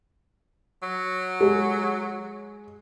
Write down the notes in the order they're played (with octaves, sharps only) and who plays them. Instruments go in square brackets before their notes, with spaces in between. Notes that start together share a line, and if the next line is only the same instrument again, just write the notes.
[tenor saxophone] F#3
[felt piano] G#3